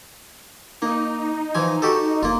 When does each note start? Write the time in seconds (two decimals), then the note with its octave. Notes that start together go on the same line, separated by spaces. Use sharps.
0.82 A#3 D#4
1.55 E3 F3 G#5
1.82 F#4 G4 A4
2.23 F1 A#3 F4